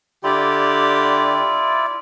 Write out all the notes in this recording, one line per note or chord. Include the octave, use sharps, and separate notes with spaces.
D3 E4 F4 G4 D5